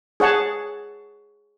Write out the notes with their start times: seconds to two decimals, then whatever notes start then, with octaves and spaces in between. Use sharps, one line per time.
0.20 G#4 C#5 F#5 A5